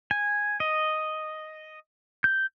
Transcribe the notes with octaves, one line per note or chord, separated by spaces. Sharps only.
G#5
D#5
G6